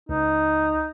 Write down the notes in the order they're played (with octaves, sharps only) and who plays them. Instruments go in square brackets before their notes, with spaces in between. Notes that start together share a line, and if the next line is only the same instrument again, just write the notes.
[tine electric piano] C#2 [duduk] D#4